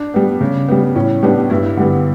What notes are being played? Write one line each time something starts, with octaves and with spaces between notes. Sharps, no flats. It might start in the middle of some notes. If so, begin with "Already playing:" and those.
Already playing: D4
G3 B3
C#3
G3 B3
A2 C#4
G3 B3 D4
G2 E4
D3 G3 B3